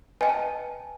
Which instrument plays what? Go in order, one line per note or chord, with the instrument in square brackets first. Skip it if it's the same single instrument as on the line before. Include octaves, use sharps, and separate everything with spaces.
[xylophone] B4 D#5 G5 G#5
A5